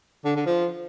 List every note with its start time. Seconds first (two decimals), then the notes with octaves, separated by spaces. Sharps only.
0.25 D3
0.35 D3
0.46 F3